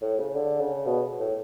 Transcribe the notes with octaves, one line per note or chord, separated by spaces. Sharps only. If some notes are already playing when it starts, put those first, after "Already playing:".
A2
C#3
D3
C#3
B2
A2